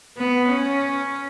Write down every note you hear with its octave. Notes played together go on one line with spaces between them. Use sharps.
B3
C#4